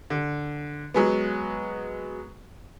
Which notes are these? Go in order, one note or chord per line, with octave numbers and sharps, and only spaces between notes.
D3
F#3 G#3 B3